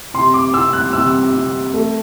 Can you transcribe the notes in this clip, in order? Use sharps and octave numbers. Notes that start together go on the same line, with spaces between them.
C3 C6
D6
C3 E6
F#6
C3 E6
C3
A3